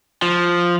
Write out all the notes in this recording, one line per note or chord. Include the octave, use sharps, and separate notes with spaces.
F3